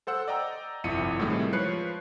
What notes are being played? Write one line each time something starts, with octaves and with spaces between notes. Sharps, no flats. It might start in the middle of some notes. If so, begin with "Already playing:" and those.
A4 C5 F#5 E6
D5 D#5 G5 A#5
G1 C2 F2 E4 C#7 D#7
A2 C3 D#3 G3 G#3
F3 B4 C#5 F#6 C7 C#7